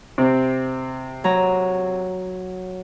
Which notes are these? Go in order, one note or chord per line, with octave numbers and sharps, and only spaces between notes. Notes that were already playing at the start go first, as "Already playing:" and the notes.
C3 C4
F#3 A#5